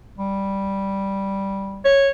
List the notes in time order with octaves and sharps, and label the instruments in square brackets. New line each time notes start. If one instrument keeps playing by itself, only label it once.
[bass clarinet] G3
[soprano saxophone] C#5